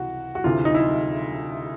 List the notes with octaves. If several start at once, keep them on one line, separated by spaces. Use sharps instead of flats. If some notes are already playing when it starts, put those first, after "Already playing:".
Already playing: C#2 C3 E3 F#4
F#4
D2 C3 E3 F4
D#4
E4